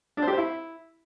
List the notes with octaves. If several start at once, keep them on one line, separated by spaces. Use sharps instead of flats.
D4
C5
G4
C5
E4